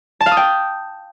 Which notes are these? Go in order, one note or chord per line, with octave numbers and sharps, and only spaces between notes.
A5
F5
D#6
G5